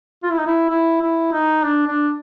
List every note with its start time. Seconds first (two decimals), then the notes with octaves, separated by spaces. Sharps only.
0.23 F4
0.30 E4
0.38 D#4
0.47 E4
0.69 E4
1.02 E4
1.32 D#4
1.63 D4
1.87 D4